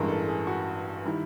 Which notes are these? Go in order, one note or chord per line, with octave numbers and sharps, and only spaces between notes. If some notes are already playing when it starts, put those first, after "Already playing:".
Already playing: A1 G2 E3 G#3 A#4
A4
G#4
F#4
D#3 G3 E4